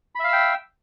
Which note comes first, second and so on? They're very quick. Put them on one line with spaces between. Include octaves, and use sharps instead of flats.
B5 E5 F5 E6 G5